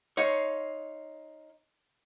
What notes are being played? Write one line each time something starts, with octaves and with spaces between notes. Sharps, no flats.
D#4 C#5 F5 C6